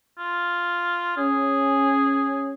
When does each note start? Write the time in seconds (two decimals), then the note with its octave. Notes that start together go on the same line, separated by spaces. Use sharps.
0.18 F4
1.17 C#4 G#4